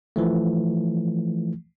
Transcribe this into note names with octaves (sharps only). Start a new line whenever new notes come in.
E3 F3 A3